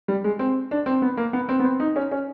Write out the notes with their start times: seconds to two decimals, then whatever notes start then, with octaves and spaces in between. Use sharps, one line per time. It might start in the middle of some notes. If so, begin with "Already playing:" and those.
0.08 G3
0.24 G#3
0.39 C4
0.71 D4
0.86 C4
1.02 B3
1.17 A#3
1.33 B3
1.49 C4
1.60 B3
1.64 C4
1.80 D#4
1.96 C#4
2.11 C#4